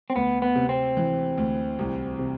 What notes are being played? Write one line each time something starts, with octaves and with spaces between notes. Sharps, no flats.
C4
D2 B3
B3
C3
C4
E3
D2
C2
C3